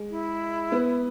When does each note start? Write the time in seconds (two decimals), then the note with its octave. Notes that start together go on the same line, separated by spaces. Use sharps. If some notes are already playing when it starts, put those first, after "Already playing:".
Already playing: G#3
0.10 E4
0.72 B3